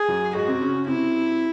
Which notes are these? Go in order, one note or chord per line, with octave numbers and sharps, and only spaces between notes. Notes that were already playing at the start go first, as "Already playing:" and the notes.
Already playing: G#4
F#2 F#3
G#2 G#3 F#4
C3 C4
C#3 C#4
C#3 C#4
C3 C4 E4